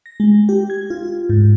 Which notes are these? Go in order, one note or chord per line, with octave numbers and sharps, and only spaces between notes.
A#6
G#3
G4
G#6
F4
G#2